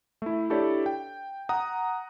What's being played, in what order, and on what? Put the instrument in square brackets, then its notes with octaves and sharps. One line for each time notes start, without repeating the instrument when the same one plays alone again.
[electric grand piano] A3 E4
D4 E4 G4 A4 C#5 D5
G5
F#5 A#5 D#6